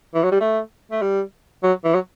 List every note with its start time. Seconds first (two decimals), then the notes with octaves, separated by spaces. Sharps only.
0.14 E3
0.23 F#3
0.31 G3
0.40 A3
0.91 A3
1.02 G3
1.63 F#3
1.84 E3
1.94 F#3